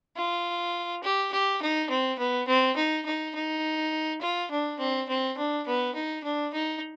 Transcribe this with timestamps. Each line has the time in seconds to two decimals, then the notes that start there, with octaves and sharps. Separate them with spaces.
0.17 F4
1.03 G4
1.33 G4
1.62 D#4
1.90 C4
2.19 B3
2.48 C4
2.77 D#4
3.06 D#4
3.35 D#4
4.21 F4
4.51 D4
4.79 C4
5.09 C4
5.37 D4
5.67 B3
5.95 D#4
6.24 D4
6.54 D#4